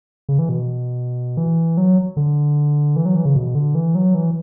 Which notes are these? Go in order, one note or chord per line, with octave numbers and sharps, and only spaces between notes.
C#3
E3
B2
E3
F#3
D3
E3
F#3
E3
C#3
B2
D3
E3
F#3
E3